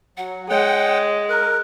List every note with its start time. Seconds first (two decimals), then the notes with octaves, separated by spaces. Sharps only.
0.17 F#3 F#5
0.49 G#3 C#5 F#5 G5
1.29 A#4 F#6